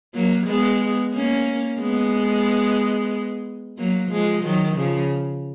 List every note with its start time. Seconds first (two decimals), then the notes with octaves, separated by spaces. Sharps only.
0.14 F#3 A#3
0.47 G#3 B3
1.14 A#3 C#4
1.80 G#3 B3
3.78 F#3 A#3
4.11 F3 G#3
4.44 D#3 F#3
4.77 C#3 F3